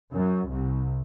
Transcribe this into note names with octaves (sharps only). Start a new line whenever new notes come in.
F#2
C2